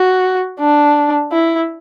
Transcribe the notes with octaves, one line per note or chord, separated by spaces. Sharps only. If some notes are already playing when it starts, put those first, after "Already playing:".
Already playing: F#4
D4
E4